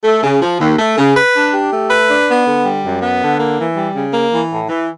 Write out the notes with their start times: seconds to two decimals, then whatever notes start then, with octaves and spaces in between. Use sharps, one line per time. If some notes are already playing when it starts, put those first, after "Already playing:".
0.04 A3
0.24 C#3
0.42 F3
0.60 D#2
0.79 A3
0.98 C#3
1.16 B4
1.35 D4
1.53 G4
1.72 A3
1.91 B4
2.09 D4
2.27 B3
2.46 D3
2.65 G3
2.84 F#2
3.02 B3
3.20 D3
3.39 A#3
3.58 E3
3.77 G3
3.95 C#3
4.14 A#3
4.32 E3
4.50 A2
4.69 E3